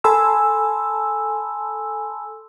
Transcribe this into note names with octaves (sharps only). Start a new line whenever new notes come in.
A4 G#5 A5 B5 C6 E6